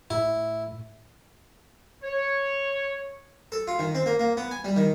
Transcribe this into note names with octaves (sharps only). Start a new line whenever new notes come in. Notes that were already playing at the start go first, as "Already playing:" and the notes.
A2 E4
C#5
A4
F4
D#3
C4
A#3
A#3
B3
G#5
G3
D#3